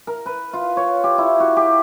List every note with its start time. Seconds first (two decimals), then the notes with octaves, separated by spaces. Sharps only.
0.07 A#4
0.26 B4
0.53 F4
0.77 C#5
1.04 G4
1.18 E4
1.40 F#4
1.57 G4